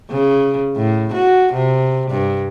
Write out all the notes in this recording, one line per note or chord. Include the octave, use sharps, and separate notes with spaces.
C#3
A2
F#4
C3
G2